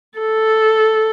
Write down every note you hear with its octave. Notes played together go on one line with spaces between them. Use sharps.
A4